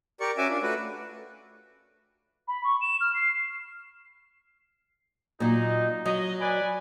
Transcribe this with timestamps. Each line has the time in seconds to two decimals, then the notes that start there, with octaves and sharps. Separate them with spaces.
0.20 G4 A#4 D5 C#6
0.37 C#4 F#4 E5 G#5 D6
0.49 D4 F4
0.62 A3 F#4 B4
2.47 B5
2.63 C#6
2.81 E7
3.00 F6
3.14 C7
5.40 A#2 F#3 D#4
6.06 F#3 D#5
6.41 B4 D5 G#5